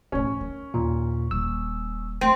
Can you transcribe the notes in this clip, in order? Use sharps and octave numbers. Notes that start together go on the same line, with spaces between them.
A2 F3 C#4
D#3
D#2 A#2
D#1 E6
A3 C4